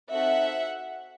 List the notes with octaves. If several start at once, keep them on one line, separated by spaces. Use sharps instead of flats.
C4 D#4 F#4 A4 E5 F#5